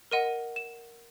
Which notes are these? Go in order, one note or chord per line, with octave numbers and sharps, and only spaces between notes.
A#4 D#5 F#5 D#7
E7